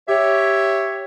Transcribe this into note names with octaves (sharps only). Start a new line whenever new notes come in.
G4 C#5 E5